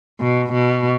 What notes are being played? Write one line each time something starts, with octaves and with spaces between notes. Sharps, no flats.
B2
B2